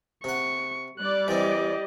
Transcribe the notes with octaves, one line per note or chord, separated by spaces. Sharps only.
C3 F#5 C#6
G3 D5 F#6
E3 C4 G4 D#5